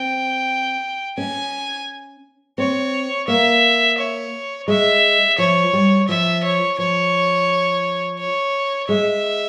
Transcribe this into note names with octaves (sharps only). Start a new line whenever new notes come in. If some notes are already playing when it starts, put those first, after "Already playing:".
Already playing: C4 G5
C#4 G#5
C4 C#5
A#3 E5
C#5
G#3 E5
F3 C#5
G3
F3 E5
C#5
F3 C#5
C#5
G#3 E5